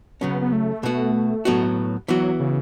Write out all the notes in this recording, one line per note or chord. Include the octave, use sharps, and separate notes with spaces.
C#3 F#3 B3 C#4
B3
A3
B2 B3 F#4
A2 F#3 B3 F#4
E3 F#3 B3 F#4
C#3